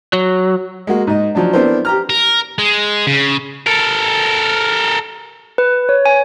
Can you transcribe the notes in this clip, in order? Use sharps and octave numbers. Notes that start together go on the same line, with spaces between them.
F#3
G#3 A#3 F#4
G#2 D#5
F3 F#3 D4
B3 C4 D4 E4 A#4 C5
G4 A#5 F6
A#4
G#3
C#3
A4 A#4
B4
C#5
G#5